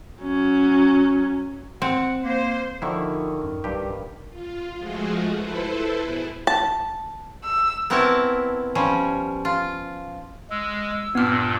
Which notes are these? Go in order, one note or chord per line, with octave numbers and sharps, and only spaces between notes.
F#3 C#4
C4 F#5
A#3 C5
D3 D#3 F3 E4 C#6
F#2
B1 G2 G4
F4
F3 G#3 A3 F4 F#4 G#4
E4 A4 B4 C5
B2 E4 G#4
A5
E6
B3 C4 E4 A#4 C#5 A5
F3 G3 C#4
F4
G#3 E6
G2 A#2 B3 F6